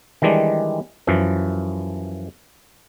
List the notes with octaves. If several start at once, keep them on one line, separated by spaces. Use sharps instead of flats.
D#3 E3 G3 G#3 D4
F#2 E3 F3